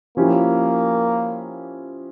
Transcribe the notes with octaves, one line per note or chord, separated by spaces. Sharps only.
F3 A#3 C#4 E4 G4